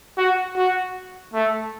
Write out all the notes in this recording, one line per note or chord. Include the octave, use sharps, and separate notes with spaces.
F#4
F#4
A3